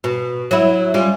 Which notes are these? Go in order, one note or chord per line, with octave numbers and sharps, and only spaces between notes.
B2
F#3 E4
G3 C#4 F4